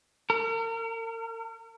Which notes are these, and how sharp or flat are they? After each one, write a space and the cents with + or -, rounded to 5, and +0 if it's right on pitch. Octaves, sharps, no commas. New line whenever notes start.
A#4 -40